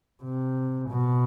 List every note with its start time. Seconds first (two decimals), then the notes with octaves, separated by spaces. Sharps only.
0.24 C3
0.89 B2